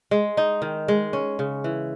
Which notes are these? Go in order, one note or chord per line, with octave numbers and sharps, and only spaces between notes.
G#3
D#4
D#3
G#3
C#4
C#3
E3